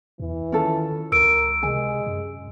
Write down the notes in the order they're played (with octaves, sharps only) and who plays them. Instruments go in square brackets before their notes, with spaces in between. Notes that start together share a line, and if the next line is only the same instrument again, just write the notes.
[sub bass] E2 [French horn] E3
[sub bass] D#3 [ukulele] C#4 F4 A4
[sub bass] C#2 [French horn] A#4 [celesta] E6 D7
[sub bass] C3 [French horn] G#3 [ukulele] G#5
[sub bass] F#2